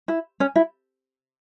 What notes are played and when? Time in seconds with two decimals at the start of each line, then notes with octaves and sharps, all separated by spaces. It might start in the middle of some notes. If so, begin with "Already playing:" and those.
0.08 E4
0.40 C#4
0.56 E4